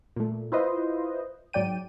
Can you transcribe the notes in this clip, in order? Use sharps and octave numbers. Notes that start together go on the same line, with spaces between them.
A#2 A3
E4 F4 B4 C5 D#5
G#2 F#3 D5 G5 D#7